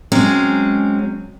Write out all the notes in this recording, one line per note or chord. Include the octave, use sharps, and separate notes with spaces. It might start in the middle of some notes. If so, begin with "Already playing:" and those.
F#3 G#3 C4 C#4